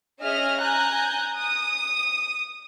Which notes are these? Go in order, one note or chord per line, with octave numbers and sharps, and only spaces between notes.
C#4 G#4 D#5 E5 F6
G#5 A#5 F#6 G6
D#6